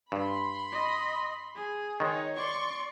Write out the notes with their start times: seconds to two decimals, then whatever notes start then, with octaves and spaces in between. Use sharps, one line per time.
0.12 G2 B5 C6
0.72 D#5
1.55 G#4
2.00 D#3 G#3 D#4 C#5
2.37 D5 C6 C#6